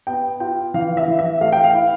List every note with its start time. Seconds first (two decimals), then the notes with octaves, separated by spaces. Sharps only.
0.07 B3 G5
0.40 F4 G5
0.74 E3 F5
0.97 E5
1.08 E3
1.19 E5
1.41 A3 F5
1.53 G5
1.64 F5
1.74 E4